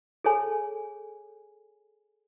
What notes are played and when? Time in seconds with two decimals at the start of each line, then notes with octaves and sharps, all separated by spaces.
0.24 G#4 A4 C#5 G#5